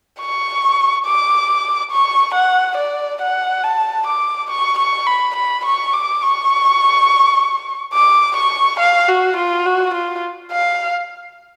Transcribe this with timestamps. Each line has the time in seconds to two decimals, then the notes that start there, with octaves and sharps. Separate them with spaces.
0.20 C#6
1.06 D6
1.91 C#6
2.34 F#5
2.78 D5
3.21 F#5
3.63 A5
4.07 D6
4.50 C#6
4.78 C#6
5.07 B5
5.36 B5
5.65 C#6
5.93 D6
6.22 C#6
7.94 D6
8.37 C#6
8.80 F5
9.09 F#4
9.37 F4
9.66 F#4
9.94 F4
10.51 F5